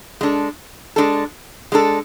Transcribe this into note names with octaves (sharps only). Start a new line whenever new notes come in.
G#3 D4 A4
G#3 D4 A4
G#3 D4 A4